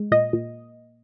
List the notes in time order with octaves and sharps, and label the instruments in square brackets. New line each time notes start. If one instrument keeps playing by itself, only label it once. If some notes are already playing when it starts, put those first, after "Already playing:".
Already playing: [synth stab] G#3
A#2 D#5
A#2